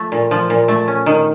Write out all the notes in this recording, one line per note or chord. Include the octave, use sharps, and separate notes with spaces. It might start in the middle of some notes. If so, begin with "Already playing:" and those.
Already playing: F3 A3
A#2
F3
A#2
A3
C#4
D#3